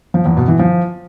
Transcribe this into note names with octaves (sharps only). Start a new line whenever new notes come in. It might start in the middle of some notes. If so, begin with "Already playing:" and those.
F3
E2
B2
E3
F3